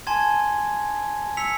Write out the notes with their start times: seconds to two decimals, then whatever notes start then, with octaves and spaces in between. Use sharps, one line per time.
0.07 G#5 A5 C6 G#6
1.37 E6 B6 C#7 F7